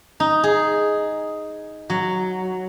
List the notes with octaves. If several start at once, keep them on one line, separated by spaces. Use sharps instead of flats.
D#4
G#4
F#3